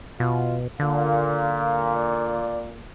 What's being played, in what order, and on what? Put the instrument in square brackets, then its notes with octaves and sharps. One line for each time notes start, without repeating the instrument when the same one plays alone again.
[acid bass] B2 [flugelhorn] F4
[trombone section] A#2 [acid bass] D3 [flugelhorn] F5
[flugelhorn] D5